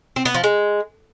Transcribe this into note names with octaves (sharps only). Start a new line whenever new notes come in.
C4
B3
F3
G#3